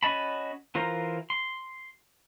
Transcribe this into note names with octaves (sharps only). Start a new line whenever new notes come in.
C#4 F#4 D#5 A5 B5
E3 F4 A#4 C5 A#5
C6